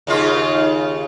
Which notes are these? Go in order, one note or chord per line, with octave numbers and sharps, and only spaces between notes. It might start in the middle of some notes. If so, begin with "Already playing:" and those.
D#2 C#3 F4